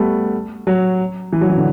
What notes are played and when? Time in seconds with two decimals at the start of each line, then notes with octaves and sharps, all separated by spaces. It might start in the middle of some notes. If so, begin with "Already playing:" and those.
Already playing: G3 A3 B3
0.67 F#3
1.33 E3
1.41 F#3
1.50 E3
1.57 D3